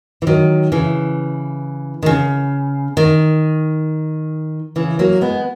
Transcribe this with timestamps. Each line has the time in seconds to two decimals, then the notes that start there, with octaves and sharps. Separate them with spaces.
0.22 E3
0.27 D#3 F#3
0.72 C#3 E3
2.03 D#3
2.06 C#3
2.97 D#3
4.76 C#3 E3
4.99 F#3 A#3
5.21 G#3 B3